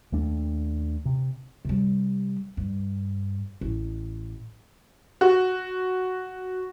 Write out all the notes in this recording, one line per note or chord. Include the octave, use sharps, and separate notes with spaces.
D#2 A3 D4
C3
C3 G3
G2
A1
F#4